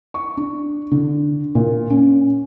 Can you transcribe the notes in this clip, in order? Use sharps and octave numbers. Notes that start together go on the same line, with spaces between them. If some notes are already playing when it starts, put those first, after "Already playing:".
C#6
D4
D3
A#2
C#4